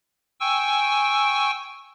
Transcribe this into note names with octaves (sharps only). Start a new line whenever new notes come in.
G5 G#5 C#6 E6